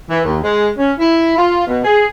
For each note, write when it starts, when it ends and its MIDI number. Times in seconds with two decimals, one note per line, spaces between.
0.09 0.21 52
0.25 0.39 39
0.43 0.68 56
0.78 0.92 61
0.99 1.35 64
1.37 1.66 65
1.67 1.80 47
1.84 2.06 68